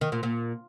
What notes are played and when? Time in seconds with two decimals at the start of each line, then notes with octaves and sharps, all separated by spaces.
0.01 D#3
0.12 A#2
0.23 A#2